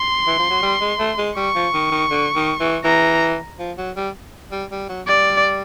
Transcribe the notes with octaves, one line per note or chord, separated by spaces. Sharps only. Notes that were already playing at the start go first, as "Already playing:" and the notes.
Already playing: C6
E3
F3
F#3
G3
G#3
A3
G#3
G3 C#6
F3
D#3
D#3
D3
D#3
E3
E3 A#5
F3
F#3
G3
G3
G3
F#3
G3 D5